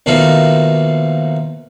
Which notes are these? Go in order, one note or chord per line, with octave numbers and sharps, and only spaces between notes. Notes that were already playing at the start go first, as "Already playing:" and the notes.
D#2 B2 F3 A3 A#3 D#4